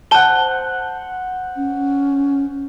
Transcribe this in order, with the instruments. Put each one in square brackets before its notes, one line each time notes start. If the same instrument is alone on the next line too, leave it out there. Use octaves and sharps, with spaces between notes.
[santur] C5 F#5 [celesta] A5 G7
[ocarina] C#4